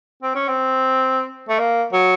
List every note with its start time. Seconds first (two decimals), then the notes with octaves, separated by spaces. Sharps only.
0.23 C4
0.35 C#4
0.48 C4
1.49 A3
1.59 A#3
1.93 F#3